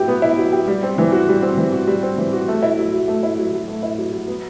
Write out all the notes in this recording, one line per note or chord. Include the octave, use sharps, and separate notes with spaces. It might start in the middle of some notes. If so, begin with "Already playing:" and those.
Already playing: F#3 E4 G4
B3
E4
F#3
G4
G3
C4
E3
F#4
G3
C4
E3
F#4
G3
C4
E3
F#4
A3
E4
F#3
F#3
A3
E4
F#3
F#3
A3
E4
F#3
F#3
B3